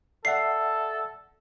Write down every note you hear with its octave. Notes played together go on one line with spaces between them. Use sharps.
A4 D5 E5 F#5 C7